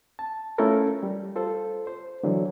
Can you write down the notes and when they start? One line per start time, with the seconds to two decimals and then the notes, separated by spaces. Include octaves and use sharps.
0.19 A5
0.58 A3 C#4 E4 F4 A4 A#4
1.03 G3
1.36 F4 A4 C5
1.87 C5
2.23 D3 E3 F#3